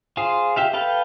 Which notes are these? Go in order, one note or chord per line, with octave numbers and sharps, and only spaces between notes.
F4 G#4 C5
G4 E5 F5
A4 B4 F5 G5